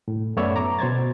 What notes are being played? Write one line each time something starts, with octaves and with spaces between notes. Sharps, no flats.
A2
F#2 A3 B3 C#5 D5 E5
A#5 D6
B2 C5 G#6 A6